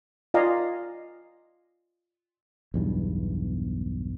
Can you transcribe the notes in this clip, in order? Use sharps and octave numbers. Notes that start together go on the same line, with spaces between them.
F4 D5 D#5 F5 G#5 A#5
B1 E2 G2